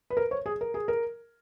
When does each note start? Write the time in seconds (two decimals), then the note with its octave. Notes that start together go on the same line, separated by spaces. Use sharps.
0.10 B4
0.17 A#4
0.31 C#5
0.46 G#4
0.61 A#4
0.74 G#4
0.88 A#4